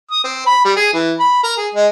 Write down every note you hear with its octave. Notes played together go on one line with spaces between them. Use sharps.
D#6
C4
B5
G3
G#4
E3
B5
A#4
G#4
G#3